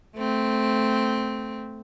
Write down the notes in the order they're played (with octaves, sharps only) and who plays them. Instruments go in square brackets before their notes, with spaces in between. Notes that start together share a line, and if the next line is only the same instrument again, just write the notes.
[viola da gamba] A3 C4